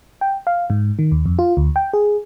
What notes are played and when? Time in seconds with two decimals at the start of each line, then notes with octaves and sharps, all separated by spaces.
0.21 G5
0.47 F5
0.70 G#2
0.99 D#3
1.12 D#2
1.26 F2
1.39 F4
1.57 D2
1.76 G5
1.93 G#4